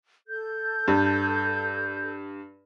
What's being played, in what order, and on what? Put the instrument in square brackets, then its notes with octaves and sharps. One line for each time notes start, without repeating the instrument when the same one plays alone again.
[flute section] A4 G6
[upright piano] G2